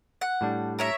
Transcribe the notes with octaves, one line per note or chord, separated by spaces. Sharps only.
F#5
A2 G3 D4
A#4 C#5 E5